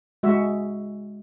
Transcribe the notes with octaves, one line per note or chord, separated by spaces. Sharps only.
G#3 F#4 E5